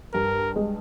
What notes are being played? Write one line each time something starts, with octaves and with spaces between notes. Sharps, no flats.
G2 A#4
G#3